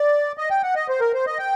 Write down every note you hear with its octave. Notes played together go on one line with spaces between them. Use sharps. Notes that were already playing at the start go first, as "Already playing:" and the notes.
Already playing: D5
D#5
G5
F#5
D#5
C5
A#4
C5
D#5
G5